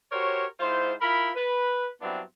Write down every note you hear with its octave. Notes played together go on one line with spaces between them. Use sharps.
F#4 G4 A#4 C5 C#5
G#2 E4 F4 C5
E4 F4 A#4 B5
B4
G2 F#3 B3 C4 D4 E4